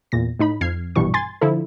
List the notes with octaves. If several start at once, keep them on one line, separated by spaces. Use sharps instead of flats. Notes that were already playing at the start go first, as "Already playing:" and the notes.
E2 A#2 A#6
A2 D#4 B5
F2 F6 G#6 C7
A#1 G2 B2 E3 G3 C#6
G#5 C6 G#6 A6
D3 F3 E4 A4